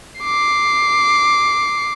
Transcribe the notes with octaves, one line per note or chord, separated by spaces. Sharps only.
D6 C7